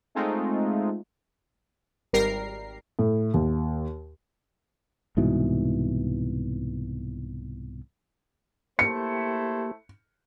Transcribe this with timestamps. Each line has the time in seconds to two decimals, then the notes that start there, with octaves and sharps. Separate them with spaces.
0.15 G#3 A3 C4 D#4 F4
2.13 G#1 G3 A#4 A#5 C7
2.99 A2
3.34 D#2
5.17 C2 G#2 B2 E3
8.79 A3 A#3 E4 G4 C5 C#7